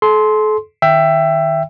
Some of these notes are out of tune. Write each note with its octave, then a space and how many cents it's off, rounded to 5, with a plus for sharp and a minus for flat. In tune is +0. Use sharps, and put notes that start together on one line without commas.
A4 -40 C6 +0
D#3 +0 E5 +15 G5 +0